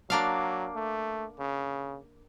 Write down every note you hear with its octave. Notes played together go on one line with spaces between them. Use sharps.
F#3 A#3 D4 F5
A3
C#3